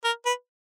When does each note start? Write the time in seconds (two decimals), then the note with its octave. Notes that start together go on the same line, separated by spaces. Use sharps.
0.04 A#4
0.26 B4